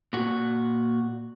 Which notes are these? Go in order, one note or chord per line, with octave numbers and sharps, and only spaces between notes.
A#2 F#4